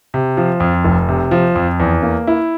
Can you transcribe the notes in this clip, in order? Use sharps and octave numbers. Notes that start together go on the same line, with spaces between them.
C3
F3
F2
F1
C3
F3
F2
E2
A#3
E4